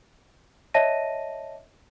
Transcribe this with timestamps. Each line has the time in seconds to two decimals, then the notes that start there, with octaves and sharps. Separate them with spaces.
0.74 C#5 D#5 E5 A5 A#6 D#7